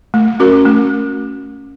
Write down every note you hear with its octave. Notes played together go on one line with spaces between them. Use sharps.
A3
C#4 F#4 A#4
A3